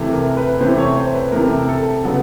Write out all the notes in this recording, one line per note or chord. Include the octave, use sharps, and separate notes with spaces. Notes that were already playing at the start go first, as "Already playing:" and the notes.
Already playing: C3 E3 A3
A#4
B4
C3 E3 A3 C5
C#5
C5
B4
C3 E3 A3 A#4
A4
C#3 F#3 B3 A4